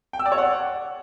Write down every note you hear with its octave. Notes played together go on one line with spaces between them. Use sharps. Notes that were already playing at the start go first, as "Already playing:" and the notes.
G5
E6
D5
C#5
F#5